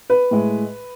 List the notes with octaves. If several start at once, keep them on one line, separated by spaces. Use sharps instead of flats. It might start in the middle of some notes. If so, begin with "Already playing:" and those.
B4
A2 G#3